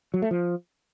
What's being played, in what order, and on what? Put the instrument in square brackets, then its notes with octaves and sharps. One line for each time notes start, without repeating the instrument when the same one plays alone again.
[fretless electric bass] F#3
A3
F3